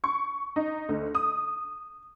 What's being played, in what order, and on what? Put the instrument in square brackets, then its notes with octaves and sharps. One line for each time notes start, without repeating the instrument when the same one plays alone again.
[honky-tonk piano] C#6
D#4
D2
D#6